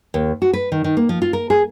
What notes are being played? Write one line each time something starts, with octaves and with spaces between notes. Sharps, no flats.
D#2
F#4
B4
D#3
D#3
A#3
F3
F4
A#4
G#4